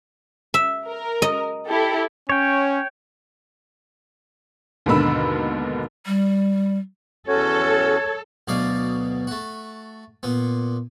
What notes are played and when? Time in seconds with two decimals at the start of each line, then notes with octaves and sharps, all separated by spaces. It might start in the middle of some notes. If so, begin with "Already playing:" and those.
0.54 E5
0.88 A#4
1.22 D#5
1.68 E4 G4 A4
2.30 C#4 C#5 G5
4.86 D#2 G#2 B2 D3 B5 E6
6.06 G3
7.28 E2 C#4 F#4 A4 C#5
8.48 D2 B2 F#3 D5 D#5 F5
9.27 A3 F#4
10.23 A#2 B3